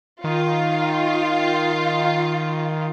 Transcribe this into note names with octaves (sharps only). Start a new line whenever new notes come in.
D#3 F4